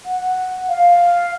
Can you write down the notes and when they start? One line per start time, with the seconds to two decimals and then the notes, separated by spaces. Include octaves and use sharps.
0.05 F#5
0.68 F5